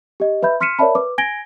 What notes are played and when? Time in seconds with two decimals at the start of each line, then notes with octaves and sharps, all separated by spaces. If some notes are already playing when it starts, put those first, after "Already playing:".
0.20 G4 D#5
0.42 B4 E5 B5 G6
0.61 C6 F6 B6 C#7 D#7 E7
0.79 A#4 C#5 D5 E5 A5 B5
0.95 B4 D6
1.18 G#5 G#6 A#6 D7 G7